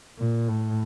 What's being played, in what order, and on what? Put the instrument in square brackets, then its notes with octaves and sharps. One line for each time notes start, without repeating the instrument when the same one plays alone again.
[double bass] A#2
A2